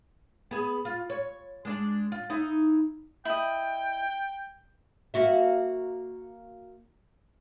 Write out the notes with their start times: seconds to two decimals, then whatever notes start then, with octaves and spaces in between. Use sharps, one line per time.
0.51 B3 G#4
0.85 F4
1.10 C#5
1.65 G#3 D4
2.12 F4
2.30 D#4 E4
3.25 E4 D#5 G5
5.14 A#3 F#4 E5